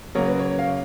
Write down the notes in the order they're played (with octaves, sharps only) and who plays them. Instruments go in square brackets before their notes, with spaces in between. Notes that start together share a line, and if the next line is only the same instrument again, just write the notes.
[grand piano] C#3 F#3 A#3 [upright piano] C#5
[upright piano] B4
C#5
F5